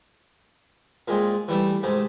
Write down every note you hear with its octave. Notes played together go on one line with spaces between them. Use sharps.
A#2 G#3 C4
E3 G3 A3
G#2 C3 A3